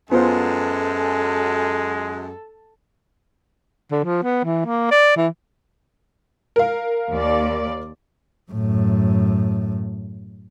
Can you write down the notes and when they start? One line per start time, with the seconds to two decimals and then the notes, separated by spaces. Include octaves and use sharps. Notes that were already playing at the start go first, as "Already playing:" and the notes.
0.12 F#2 G#3 B3 F4 A4 C5
3.91 D3
4.05 F3
4.23 B3
4.45 E3
4.66 A#3
4.91 D5
5.16 E3
6.56 A#4 F5
7.09 D#2 D5
8.52 F#2 A2